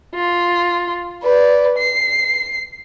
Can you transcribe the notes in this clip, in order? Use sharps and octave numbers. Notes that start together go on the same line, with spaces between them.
F4
B4 D5
C7